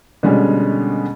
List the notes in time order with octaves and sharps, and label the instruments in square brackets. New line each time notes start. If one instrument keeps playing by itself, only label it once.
[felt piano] B2 D3 G3 G#3 C#4